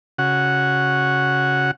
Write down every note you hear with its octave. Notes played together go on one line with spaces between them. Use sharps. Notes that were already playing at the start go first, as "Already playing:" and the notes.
C#3 F#4 F#5